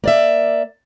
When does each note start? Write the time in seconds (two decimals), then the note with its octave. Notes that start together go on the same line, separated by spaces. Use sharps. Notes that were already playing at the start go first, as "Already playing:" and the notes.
0.04 A#3 D5 E5